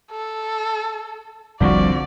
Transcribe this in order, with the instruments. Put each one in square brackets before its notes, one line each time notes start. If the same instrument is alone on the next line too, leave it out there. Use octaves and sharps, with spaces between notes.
[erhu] A4
[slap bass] F1 C2 [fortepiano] D3 F3 F#4 [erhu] D5